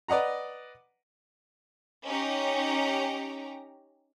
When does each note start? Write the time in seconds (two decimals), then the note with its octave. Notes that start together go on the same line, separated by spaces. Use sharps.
0.08 B4 D5 D#5 F#5 A#5
2.05 C#4 D#4 G4 A#5